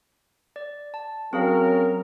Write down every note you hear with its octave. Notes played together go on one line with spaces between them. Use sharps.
D5
A5
F#3 C4 C#4 G#4 A#4 F5